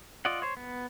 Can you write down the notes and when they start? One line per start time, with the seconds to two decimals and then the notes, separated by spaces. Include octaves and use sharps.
0.25 F4 D5 D#5 F#5
0.42 C5 C#5
0.57 B3